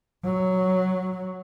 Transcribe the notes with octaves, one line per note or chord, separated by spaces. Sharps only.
F#3